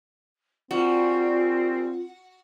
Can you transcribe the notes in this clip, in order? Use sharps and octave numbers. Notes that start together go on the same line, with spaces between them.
A#2 G3 C4 F4 F#4